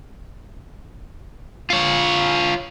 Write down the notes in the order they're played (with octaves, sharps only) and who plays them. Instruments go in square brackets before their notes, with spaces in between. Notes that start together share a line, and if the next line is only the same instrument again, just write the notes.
[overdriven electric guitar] F4 C#5